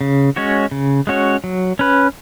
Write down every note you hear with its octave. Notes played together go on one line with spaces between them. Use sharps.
C#3
G#3 C#4 F#4 C#5
C#3
G#3 C#4 F#4 C#5
F#3
C#4 B4